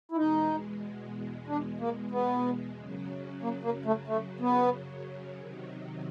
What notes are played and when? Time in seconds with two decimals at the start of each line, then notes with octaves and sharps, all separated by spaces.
0.12 E4
0.16 E2 B2 G#3 D#4
1.47 D4
1.80 A#3
2.11 B3
2.78 F#2 C#3 F#3
3.42 A#3
3.64 A#3
3.85 A3
4.07 A3
4.40 B3
5.38 C3 D#3 F#3